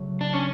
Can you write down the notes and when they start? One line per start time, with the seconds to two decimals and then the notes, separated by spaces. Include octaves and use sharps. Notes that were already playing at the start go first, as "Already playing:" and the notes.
Already playing: C#3 F#3 A3
0.21 D4
0.33 C#4